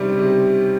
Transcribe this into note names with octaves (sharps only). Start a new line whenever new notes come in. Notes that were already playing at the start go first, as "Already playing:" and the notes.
Already playing: C3 D#3 G3 C#4
C3